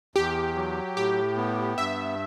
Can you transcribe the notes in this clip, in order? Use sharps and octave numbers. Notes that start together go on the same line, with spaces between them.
E2 G4
F#3
A2 G4
B3
G2 E5